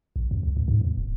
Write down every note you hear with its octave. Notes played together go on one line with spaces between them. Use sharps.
A#1
F2
C#2
E2
G#2
E2
D1